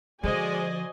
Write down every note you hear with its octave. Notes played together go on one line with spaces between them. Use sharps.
D3 F3 G#3 F#4 C5 D5 D#5 G#5